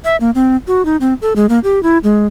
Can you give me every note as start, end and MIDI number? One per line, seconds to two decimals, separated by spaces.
0.05 0.16 76
0.20 0.30 58
0.35 0.56 60
0.67 0.85 66
0.85 0.97 63
1.01 1.14 60
1.22 1.33 69
1.36 1.46 56
1.49 1.59 58
1.64 1.82 67
1.83 1.98 64
2.04 2.27 56